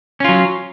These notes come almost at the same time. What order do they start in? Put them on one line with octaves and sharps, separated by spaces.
C#4 F4 F#3